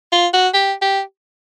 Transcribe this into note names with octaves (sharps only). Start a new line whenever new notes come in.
F4
F#4
G4
G4